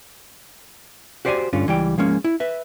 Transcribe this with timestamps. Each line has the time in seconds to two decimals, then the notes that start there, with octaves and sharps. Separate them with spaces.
1.25 F#4 G4 C5 D5 F#5 G#5
1.53 G2 D3 C#4 F4
1.67 C#2 E3 G3 G5
1.98 F3 G#3 A#3 C#4
2.24 E4
2.40 B4 E5